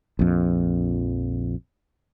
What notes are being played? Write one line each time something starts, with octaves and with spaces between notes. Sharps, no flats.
A#1 F2